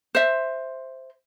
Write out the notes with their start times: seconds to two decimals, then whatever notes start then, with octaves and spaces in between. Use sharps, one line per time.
0.15 C5 E5